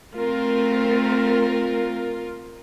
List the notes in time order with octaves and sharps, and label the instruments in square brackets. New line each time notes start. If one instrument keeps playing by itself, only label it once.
[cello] A3 C4 [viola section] F4 A#4